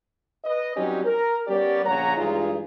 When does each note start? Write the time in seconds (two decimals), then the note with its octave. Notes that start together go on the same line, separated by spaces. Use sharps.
0.44 B4 D#5
0.76 F#3 G3 C4 C#4 D#4 G4
1.05 A#4
1.47 G3 B3 C#4 G4 A#4 D5
1.85 A#1 C#3 C#5 F#5 A#5
2.17 G2 E3 G#3 D#4 F4 G#4